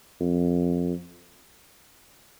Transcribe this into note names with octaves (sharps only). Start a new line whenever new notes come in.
F2